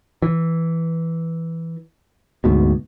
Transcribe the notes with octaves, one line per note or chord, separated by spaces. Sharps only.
E3
D2 G#2 B2